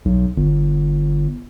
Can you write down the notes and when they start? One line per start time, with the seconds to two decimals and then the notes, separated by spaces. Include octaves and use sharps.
0.05 B1
0.36 G1